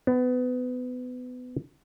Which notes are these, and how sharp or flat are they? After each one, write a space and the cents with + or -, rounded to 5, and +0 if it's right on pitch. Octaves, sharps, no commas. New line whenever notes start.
B3 +25